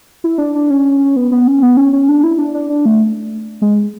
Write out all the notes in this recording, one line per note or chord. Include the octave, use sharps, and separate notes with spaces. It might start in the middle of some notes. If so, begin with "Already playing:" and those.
E4
D4
D4
C#4
B3
B3
C#4
B3
C#4
C#4
D4
E4
D4
D4
D4
A3
G#3